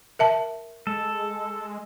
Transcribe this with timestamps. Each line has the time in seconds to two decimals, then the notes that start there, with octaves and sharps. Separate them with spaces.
0.19 A#4 E5 A5
0.87 G#3 A4